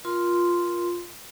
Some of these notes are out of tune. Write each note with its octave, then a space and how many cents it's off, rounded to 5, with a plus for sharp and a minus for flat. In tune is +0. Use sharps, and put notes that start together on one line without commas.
F4 +0 A#4 +20 C6 -5